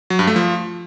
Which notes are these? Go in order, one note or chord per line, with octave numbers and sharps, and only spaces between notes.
F#3
G2
A3
F3